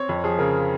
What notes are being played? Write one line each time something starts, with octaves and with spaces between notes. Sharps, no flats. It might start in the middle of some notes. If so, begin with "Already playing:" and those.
Already playing: C4 C#5
F2
F3 G#4
C#3 A#4